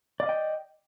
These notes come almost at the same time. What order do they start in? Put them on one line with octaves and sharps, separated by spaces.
D5 F5 D#5 G5